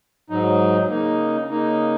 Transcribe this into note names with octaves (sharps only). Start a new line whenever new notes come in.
G#2 F#3 D#4
C#3 A#3 D#4
C#3 A#3 D#4